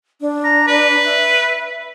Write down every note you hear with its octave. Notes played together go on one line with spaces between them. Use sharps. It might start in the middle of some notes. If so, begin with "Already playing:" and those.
D4
A#5
B4
E5